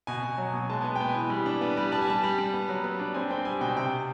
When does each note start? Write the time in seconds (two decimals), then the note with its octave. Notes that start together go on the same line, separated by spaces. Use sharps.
0.07 B2 G#5
0.23 B2
0.38 F#3
0.53 B2
0.70 G#3 A5
0.82 B3 G#5
0.96 B3 G5
1.09 G#5
1.15 E3
1.30 G3
1.46 D4
1.61 B3
1.77 G3
1.92 G3 A5
2.02 G#5
2.07 G3 A5
2.23 G3
2.38 G3
2.54 B3
2.69 F#3
2.84 B3
2.99 D4
3.14 C4 G#5
3.31 C4 G5
3.45 G3 G#5
3.61 B2 G5
3.76 C3 G5